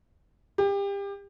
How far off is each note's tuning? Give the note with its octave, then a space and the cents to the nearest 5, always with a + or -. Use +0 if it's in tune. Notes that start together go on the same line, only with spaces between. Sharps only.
G4 +30